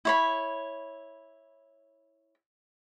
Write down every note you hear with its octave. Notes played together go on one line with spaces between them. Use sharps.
E4 C#5 B5